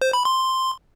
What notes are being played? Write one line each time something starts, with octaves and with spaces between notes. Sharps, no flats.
C5
B5
C6